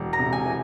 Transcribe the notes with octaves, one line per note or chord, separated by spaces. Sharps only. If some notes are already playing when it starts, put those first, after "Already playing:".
Already playing: E1
A#5
C3
G#5
E3